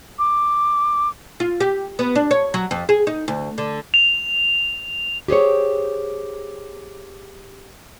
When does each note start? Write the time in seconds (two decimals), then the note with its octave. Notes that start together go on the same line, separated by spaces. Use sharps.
0.19 D6
1.40 F4
1.60 G4
1.99 B3
2.15 D4
2.31 C#5
2.54 F#3
2.71 F2
2.89 G#4
3.07 D#4
3.28 D2
3.58 D3
3.94 F7
5.28 G4 G#4 C5 C#5